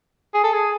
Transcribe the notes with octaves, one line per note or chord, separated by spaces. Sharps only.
G#4
A4
G#4